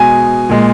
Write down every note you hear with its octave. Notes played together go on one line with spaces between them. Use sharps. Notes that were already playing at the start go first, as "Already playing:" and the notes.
Already playing: B2 G#3 G#5
A#2 G#3